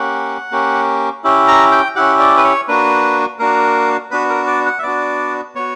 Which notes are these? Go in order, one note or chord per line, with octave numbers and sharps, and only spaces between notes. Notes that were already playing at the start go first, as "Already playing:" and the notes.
Already playing: A#3 C#4 G4 F#5
A#3 C#4 G4
C#4 E4 G4
A#5
G5
C#4 E4 G4 F#5
D5
B4
C#5
A#3 D4 F#4 B4
A#3 D4 F#4 A#4
B3 D4 F#4 B4
A#4
D5
F#5
E5
B3 D4 F#4 D5
B3 F#4 C#5